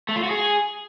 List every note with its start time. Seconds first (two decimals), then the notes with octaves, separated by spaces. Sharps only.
0.09 A3
0.16 F4
0.23 F#4
0.31 G#4